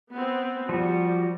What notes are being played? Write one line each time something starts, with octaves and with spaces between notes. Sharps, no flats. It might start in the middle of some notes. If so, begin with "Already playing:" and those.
B3 C4
F3 G3 F#4